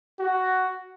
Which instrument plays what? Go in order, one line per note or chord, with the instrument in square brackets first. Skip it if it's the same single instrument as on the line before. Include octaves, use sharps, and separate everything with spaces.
[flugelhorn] F#4